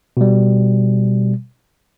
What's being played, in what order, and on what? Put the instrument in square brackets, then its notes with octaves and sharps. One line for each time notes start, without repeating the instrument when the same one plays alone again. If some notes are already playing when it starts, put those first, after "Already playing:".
[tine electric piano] B2 G3